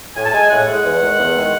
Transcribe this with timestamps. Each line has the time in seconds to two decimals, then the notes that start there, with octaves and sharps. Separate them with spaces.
0.16 A2 G#5
0.25 A5
0.34 G#3 G#5
0.50 A2 F#5
0.67 G#3
0.84 E2
1.01 D#3 G#3
1.19 E2
1.35 D#3 G#3